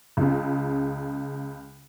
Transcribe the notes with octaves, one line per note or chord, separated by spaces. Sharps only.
C#2 C#3